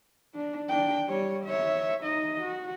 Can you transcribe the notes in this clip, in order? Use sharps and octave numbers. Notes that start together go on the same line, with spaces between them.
D4
D4 G5
G3 C#5
C#5 E5
D#4 D#5
F#4